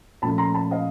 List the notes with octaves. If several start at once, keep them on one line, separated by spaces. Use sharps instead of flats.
A#2 F3 A3 C#4 A5 B5
A#5 C6
A5 B5
D#5 F5